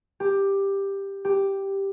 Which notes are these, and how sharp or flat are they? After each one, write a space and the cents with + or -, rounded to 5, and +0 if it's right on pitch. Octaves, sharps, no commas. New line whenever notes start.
G4 +10
G4 +0